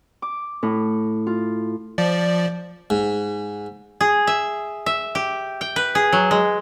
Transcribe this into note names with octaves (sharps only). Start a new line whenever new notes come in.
D6
A2
F4
F3 D5
G#2
G#4
E5
E5
G4
G5
B4
G#4
F#3
G#3